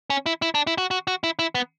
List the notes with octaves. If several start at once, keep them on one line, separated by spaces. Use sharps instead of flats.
C#4
E4
E4
D4
E4
F#4
F#4
F#4
E4
E4
B3